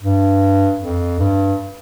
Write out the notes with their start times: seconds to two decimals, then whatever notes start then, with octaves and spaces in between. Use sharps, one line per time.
0.03 G2
0.80 F2
1.19 G2